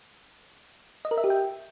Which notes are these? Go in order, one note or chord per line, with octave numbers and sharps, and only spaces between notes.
D#5
A#4
E5
G4
G5